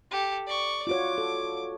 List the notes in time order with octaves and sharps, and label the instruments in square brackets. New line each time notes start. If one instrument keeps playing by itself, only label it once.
[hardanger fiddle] G4 A4
D5 C#6
[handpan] F4 F#4 C#5 [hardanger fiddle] D6
[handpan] A4